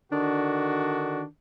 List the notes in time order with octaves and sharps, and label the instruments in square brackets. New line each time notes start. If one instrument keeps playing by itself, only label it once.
[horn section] D3 D#3 D4 F#4